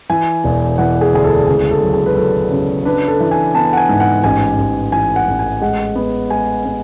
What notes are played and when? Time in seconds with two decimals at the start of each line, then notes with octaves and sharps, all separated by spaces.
0.10 E3 G#5
0.44 E1
0.78 E3 F#5
1.01 G#4
1.13 D2 G#4
1.24 A4
1.47 C#2 G#4
1.71 A4
1.82 F#3
1.93 G#4
2.06 B4
2.16 F#3 A4
2.51 C#3
2.85 D4 B4
3.08 A4
3.20 E3
3.31 G#5
3.55 B3 A5
3.73 F#5
3.77 G#5
3.89 G#2
4.00 F#5
4.24 A1 G#5
4.58 A1
4.92 E3 G#5
5.16 F#5
5.28 A1
5.39 G#5
5.61 G#3 F#5
5.96 B3
6.30 G#3 G#5
6.65 B3